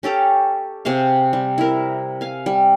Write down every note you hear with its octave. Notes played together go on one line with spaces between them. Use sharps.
C#4 G4 A4 A#5
C3 G#4 C5 F5
G3
E4 A#4
F5 G#5
G3